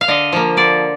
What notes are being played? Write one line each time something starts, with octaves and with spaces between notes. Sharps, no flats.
F5
D3 D#5
F3 A#3
D3 D5